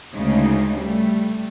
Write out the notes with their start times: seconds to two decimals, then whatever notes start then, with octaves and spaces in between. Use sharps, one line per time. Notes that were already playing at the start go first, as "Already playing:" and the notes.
0.13 D2 C#3 G#3 D#4
0.77 G3 A3